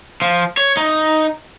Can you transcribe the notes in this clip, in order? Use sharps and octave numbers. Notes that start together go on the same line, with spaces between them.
F3
C#5
D#4